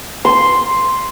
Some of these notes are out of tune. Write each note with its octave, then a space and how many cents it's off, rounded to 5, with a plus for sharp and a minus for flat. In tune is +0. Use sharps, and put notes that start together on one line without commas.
C6 +0